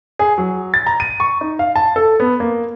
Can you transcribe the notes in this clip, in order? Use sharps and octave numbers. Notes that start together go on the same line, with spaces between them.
G#4
F#3
A6
A#5
D#7
C#6
D#4
F5
A5
A4
B3
A#3